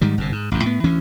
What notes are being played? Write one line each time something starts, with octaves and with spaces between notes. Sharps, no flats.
G#2 D#3 G3
G1 G2 C3
G#2
A1 F2
A2 B3
D2 E3 C#4